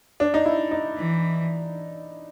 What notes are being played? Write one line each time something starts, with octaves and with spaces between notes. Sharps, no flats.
D4
D#4
E4
D#4
E3